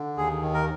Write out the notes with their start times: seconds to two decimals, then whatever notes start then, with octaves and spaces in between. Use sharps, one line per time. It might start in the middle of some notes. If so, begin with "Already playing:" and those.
Already playing: D3
0.17 D#2 G#4
0.42 D#3
0.54 A#4